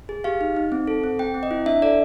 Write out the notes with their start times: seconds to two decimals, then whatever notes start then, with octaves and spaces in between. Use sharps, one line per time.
0.09 G#4
0.24 G4 F5
0.41 D#4
0.56 D#4
0.72 C4
0.87 A4
1.04 C4
1.19 C4 G5
1.34 C4
1.43 D#5
1.51 E4
1.66 D4 E5
1.82 A4 D5